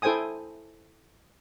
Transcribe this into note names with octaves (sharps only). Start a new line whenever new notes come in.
E4 A4 C5 G5 G#5 D#6